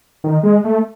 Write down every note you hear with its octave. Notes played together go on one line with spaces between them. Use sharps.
D#3
G#3
A3